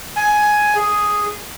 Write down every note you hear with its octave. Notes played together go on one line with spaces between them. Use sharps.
G#5
G#4